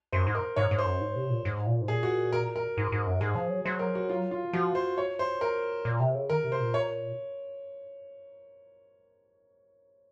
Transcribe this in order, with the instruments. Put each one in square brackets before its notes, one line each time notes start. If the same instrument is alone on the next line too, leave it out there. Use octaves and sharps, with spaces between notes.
[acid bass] F#2 [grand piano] C5
[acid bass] G#2
[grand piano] A#4
[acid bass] G#2 [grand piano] C#5
[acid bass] G#2
[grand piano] C5
[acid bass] F#2
G#2
C3
A#2
G#2
A#2
G#2
[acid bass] A#2 [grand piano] G#4
[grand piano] F#4
A#4
A#4
[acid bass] G#2
G#2
F#2
[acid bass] G#2 [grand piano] G#4
[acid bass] F3
F#3
[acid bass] F#3 [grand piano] C5
[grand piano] A#4
F#4
F4
F4
[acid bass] F3 [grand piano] F#4
[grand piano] C5
C#5
C5
A#4
[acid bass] A#2
C3
C#3
[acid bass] D#3 [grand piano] A#4
[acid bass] C3
[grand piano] C5
[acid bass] A#2
[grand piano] C#5